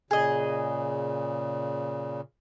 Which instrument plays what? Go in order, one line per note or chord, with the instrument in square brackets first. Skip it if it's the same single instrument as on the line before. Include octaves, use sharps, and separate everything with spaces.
[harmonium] A#2 C#3 [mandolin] G#4 D#5